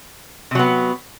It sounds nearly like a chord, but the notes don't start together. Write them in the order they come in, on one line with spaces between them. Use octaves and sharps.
C3 F#3 B3